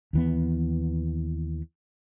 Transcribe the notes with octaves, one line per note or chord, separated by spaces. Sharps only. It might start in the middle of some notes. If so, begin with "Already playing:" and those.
D#2 E3 B3